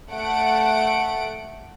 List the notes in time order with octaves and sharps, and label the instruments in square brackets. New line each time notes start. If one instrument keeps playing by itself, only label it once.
[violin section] A3 F#5 D7